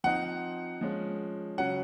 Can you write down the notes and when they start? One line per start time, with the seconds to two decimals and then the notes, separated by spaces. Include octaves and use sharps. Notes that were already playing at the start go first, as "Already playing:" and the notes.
0.04 F3 C4 D#4 F#5
0.81 F3 G#3 C#4
1.58 C#3 F#3 C#4 F#5